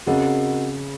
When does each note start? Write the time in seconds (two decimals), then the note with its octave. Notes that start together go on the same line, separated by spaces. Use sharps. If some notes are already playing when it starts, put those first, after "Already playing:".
0.07 C#3 C4 F#4 A#4 D#5 F#5